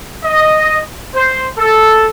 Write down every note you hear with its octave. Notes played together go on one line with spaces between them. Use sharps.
D#5
C5
A4